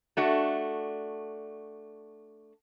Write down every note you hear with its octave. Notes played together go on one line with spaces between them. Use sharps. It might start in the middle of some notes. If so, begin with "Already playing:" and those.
A3 D4 F#4